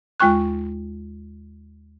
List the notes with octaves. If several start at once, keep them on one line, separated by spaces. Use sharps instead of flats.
D#2 G#3 F4 G5 C#6 F#6